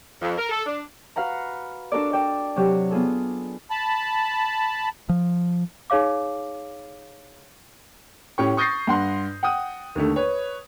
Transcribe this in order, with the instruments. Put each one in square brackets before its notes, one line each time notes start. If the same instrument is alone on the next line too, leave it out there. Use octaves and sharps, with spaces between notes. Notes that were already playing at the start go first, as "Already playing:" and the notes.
[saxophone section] F2
A#4
A4
D4
[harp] F#4 B4 F5 F#5 A#5
D4 F#4 A4 A#4 D5
A4 D5 G5
C3 F#3 F#4 G4
B3 F4 G#4 A4
[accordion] A5 B5
[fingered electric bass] F3
[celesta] D#4 G#4 C#5 F5 D6
[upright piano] A2 C#4 G4 C#5 G5 C#6
C#6 D#6 G6 A6 A#6 C7
G2 F#5 C6
F#5 G5 D#6
D#2 D3 A3
B4 C#5